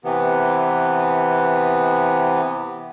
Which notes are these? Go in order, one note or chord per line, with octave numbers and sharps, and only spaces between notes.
C3 E3 B3